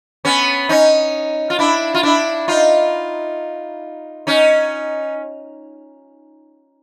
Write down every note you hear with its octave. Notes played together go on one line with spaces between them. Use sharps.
B3 C#4
C#4 D#4
F4
D4 E4
F4
D4 E4
D#4 F4
C#4 D#4